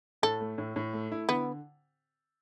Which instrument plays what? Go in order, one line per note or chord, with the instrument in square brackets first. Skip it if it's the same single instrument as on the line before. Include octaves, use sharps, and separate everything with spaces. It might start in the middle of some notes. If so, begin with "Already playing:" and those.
[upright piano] A2 [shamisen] A4
[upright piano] A3
A2
A2
A3
E4
[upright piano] D3 [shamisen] B3